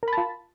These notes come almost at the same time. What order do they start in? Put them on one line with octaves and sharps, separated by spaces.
A#4 B5 A5 F4